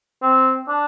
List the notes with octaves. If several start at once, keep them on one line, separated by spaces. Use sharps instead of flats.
C4
D4